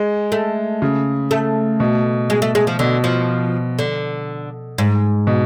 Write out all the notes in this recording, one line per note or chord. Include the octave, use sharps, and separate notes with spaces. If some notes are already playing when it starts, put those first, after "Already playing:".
Already playing: G#3
A3
C#3
A3
B2
G#3
A3
G#3
F3
B2 D3
F3
D3
G#2
B2